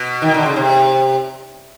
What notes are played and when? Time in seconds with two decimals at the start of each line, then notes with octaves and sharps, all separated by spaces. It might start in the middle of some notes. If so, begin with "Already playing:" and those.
Already playing: B2
0.22 D#3
0.34 D3
0.46 C#3
0.56 C3